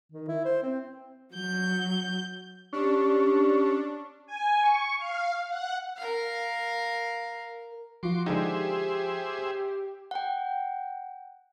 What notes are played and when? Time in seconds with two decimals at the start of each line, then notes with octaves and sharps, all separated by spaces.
0.12 D#3
0.28 E4
0.45 C5
0.62 C4
1.35 F#3 G6
2.73 C#4 D4 G4
4.26 G#5
4.61 C#6
4.97 F5
5.49 F#5
5.98 A#4 F5
8.03 F3 F4 F#4 C6 D6
8.26 D3 G#3 D#4 G4 G#4 C5 E5
10.11 F#5 G5